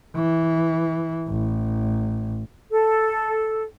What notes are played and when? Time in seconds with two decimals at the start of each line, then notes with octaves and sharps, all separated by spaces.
0.15 E3
1.29 A1
2.70 A4